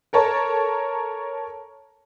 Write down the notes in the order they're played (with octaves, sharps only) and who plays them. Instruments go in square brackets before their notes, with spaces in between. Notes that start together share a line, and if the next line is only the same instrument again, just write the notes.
[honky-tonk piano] A4 A#4 C#5 A5